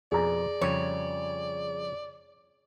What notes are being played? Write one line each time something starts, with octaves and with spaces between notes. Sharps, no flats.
F2 B2 G#4 D5 A#5
F2 C#3 G3 C#5